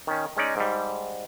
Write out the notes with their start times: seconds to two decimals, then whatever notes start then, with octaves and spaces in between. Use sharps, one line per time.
0.07 D#3 C#4
0.37 G#3 C#4 D#4 D5
0.57 G#2 G3